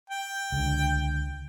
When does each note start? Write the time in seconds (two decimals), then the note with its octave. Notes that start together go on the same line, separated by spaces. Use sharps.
0.10 G5
0.52 C#2 D3